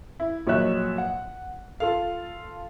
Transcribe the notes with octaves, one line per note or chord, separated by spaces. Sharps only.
E4
A#1 F#3 C#5 D#5 E5 F#6
F#5
F4 A4 F5